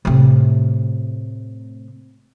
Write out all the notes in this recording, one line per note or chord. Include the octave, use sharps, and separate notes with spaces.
A2 C3